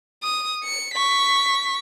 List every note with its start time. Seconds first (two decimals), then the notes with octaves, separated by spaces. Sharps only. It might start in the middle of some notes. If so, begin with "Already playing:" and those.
0.23 D#6
0.64 C#7
0.94 C#6 B6